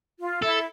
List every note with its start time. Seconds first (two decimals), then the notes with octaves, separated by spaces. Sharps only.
0.19 F4
0.42 E4 A4